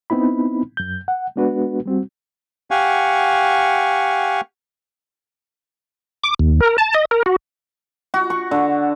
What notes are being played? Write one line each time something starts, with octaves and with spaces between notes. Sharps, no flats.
B3 C4 D#4 E4 B5
F#2 G6
F#5
G#3 B3 D4 F#4 B4
G3 C4 F#4
G4 F5 F#5 G#5 C#6
D6
D#2
A#4
A5
D#5
A#4
F#4
F#4
C#6
D3